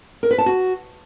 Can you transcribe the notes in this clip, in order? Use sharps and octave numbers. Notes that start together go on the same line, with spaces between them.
A#4
B4
A5
F#4